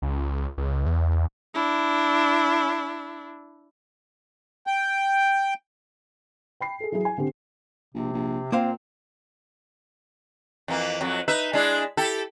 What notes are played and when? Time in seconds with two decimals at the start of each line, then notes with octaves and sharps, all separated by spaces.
0.02 C#2
0.57 C#2
0.86 E2
1.54 D4 E4
4.67 G5
6.61 G5 B5 C7
6.80 G#4 A4
6.92 E3 F#3 E4 G#4
7.05 G#5
7.17 D3 C4 G4
7.94 A#1 C3
8.13 A#1
8.52 A#2 A#3 C4 C5 F5
10.68 F2 E3 A#3
11.01 F2 F#3
11.28 D#4 B4 E5
11.53 G#3 D4 E4
11.97 E4 G4 A4